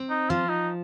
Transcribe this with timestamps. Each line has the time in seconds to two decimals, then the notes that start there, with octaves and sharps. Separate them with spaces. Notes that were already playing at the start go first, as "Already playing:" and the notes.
Already playing: C4
0.10 D#4
0.29 F3 F4
0.49 D#4